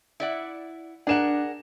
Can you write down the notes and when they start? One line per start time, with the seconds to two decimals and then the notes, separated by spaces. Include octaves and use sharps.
0.20 E4 D5 F#5
1.07 D4 G#4 A#4 F#5 E7